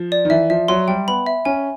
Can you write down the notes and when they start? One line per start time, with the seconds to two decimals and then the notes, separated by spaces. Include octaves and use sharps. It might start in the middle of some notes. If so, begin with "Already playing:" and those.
Already playing: F3
0.12 D5
0.25 D#3
0.30 E3 E5
0.50 F3 E5
0.68 F#3 C6
0.88 G3 G5
1.08 B3 B5
1.26 E5
1.45 C#4 G#5